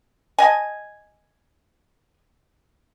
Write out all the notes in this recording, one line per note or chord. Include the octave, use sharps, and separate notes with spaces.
D#5 G#5